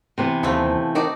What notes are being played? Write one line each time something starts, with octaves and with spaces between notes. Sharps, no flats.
C3 E3 B3
D#2 F3 A3 C4
D#3 D#4 F#4 D5